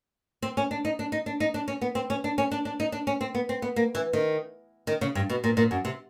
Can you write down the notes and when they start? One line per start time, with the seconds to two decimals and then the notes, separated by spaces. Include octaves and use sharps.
0.42 C4
0.57 C#4
0.71 D4
0.85 D#4
0.99 D4
1.12 D#4
1.26 D4
1.40 D#4
1.54 D4
1.68 C#4
1.81 B3
1.95 C4
2.10 C#4
2.24 D4
2.38 C#4
2.51 D4
2.65 D4
2.80 D#4
2.92 D4
3.07 C#4
3.21 C4
3.35 B3
3.49 C4
3.62 B3
3.76 A#3
3.95 E3
4.13 D#3
4.87 D#3
5.01 C#3
5.15 G2
5.30 B2
5.44 A#2
5.57 A#2
5.71 F#2
5.85 C3